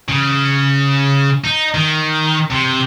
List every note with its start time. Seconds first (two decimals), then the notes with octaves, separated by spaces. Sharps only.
0.09 C#3
1.44 D#4
1.74 D#3
2.52 C3